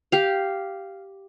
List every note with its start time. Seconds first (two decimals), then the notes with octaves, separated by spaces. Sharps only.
0.12 G4 F5